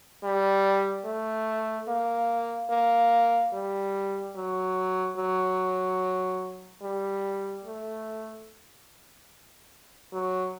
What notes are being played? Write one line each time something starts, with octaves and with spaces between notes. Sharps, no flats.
G3
A3
A#3
A#3
G3
F#3
F#3
G3
A3
F#3